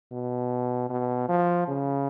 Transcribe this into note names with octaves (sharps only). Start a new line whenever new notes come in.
B2
B2
F3
C#3